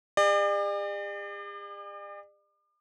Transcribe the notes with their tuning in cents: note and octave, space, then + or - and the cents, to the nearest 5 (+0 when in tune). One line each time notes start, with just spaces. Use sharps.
G#4 -45 D5 +40